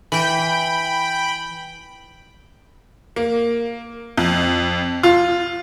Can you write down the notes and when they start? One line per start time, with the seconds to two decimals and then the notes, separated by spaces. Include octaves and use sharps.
0.12 E3 G5 B5
3.16 A#3
4.18 F2
5.03 F4